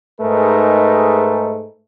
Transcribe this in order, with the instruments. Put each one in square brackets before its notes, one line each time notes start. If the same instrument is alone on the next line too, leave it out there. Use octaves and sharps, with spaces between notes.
[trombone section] G#2 A3 D#4 G#4 A#4 B4